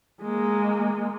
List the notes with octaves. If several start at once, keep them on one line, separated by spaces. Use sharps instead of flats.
G#3 A#3